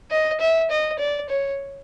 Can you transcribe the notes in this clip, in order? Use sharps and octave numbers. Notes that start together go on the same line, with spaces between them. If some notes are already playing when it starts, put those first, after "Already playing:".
D#5
E5
D#5
D5
C#5